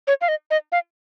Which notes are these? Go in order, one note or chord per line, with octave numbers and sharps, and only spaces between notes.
C#5
F5
D#5
D#5
F5